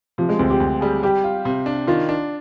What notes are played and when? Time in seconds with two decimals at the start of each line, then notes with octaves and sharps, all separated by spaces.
0.18 C3 F3
0.29 G#3
0.39 D2 C4
0.50 G4
0.60 D2
0.81 G3 G#4
1.03 G3 G4
1.24 F4
1.45 C3
1.66 D4
1.87 D#3 F4
2.09 D4